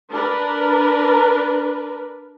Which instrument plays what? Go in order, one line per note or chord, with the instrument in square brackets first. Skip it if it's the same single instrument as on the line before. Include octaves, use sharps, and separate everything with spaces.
[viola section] D4 A#4 B4